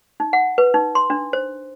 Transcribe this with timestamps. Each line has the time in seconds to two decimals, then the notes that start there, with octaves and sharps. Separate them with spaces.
0.20 D#4
0.33 F#5
0.58 B4
0.74 D#4
0.95 C6
1.10 D4
1.33 C5